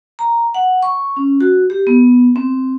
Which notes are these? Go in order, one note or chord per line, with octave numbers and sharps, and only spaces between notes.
A#5
F#5
C#6
C#4
F#4
G4
B3
C4